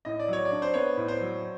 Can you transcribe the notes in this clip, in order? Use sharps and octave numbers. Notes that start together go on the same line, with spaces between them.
A2 D#5
D5
F#3 C#5
D5
D4
C5
B3 C#5
A2
C5
F#3